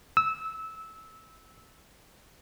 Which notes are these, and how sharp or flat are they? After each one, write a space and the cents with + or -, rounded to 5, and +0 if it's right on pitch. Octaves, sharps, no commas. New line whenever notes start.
E6 -20